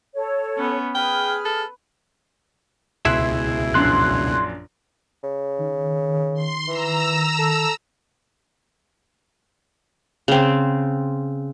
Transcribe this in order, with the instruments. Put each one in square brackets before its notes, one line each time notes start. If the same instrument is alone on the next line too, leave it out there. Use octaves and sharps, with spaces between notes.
[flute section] A4 C#5
[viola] B3 C#4
[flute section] G#4 F6 [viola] B4 [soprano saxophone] G5
[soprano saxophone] A4
[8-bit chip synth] C#2 B2 [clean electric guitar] E4 G#4 E5 [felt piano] C6 F#6
[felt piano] A#1 F#2 D4 [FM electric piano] C6 F#6
[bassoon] C#3
[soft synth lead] D#3
[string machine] C6
[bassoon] E3 [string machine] A#5 E6
[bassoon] A4
[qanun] C#3 C4